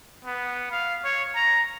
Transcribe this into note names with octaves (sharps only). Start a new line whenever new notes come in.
B3
F5
C#5
A#5